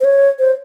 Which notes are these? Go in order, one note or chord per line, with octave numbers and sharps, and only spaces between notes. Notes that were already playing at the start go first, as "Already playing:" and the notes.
C5
C#5
C5